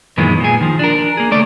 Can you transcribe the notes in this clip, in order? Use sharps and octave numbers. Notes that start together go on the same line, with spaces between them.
F#2 A#2 D#3 E3 G#3 B3
A#2 G#4
D#3 F3
D4 A#4
A#3 G#4
C#2 A3 D5